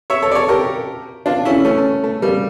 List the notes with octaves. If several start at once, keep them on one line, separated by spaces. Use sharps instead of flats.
C#5 E5
A4 C#5
D5
A4 C#5
G4 A#4
D4 F4
C#4 E4
A3 C#4
A3
A3
G3 A#3